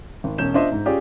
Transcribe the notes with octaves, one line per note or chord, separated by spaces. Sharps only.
G#1
E1 C#4 G6 E7
D4 F4 C5 D#5 E5
G#2
C#4 F4 G4 G#4 D5